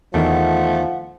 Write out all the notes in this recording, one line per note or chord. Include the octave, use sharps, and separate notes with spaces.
E2 D#3 F3 A3 F#5